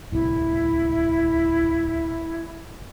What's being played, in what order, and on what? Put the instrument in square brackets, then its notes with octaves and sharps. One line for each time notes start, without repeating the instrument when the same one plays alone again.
[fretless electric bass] D1 C2 [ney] E4